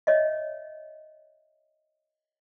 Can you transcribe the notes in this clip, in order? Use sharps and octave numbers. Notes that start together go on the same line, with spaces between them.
C#5 D#5 E5